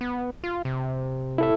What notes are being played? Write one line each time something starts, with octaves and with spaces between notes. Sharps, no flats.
B3
F4
C3
E4 A4 E5